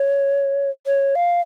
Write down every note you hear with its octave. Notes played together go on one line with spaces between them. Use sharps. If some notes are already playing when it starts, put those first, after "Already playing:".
Already playing: C#5
C#5
F5